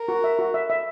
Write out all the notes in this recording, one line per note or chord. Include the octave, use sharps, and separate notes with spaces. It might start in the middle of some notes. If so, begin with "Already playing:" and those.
Already playing: A#4
F#4
E5
F#4
E5
E5